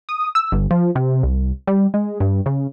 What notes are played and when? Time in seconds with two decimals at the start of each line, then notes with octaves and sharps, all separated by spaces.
0.09 D#6
0.35 E6
0.52 G1
0.71 F3
0.96 C3
1.23 C2
1.67 G3
1.94 G#3
2.20 G2
2.46 C#3